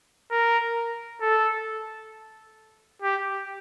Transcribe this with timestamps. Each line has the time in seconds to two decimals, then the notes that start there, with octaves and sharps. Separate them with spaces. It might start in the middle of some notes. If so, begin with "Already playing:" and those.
0.31 A#4
1.21 A4
3.02 G4